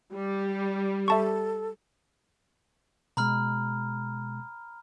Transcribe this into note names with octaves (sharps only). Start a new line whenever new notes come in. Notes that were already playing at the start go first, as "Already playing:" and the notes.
G3
A4 E5 A5 C#6
B2 G#3 A#5 B5 F6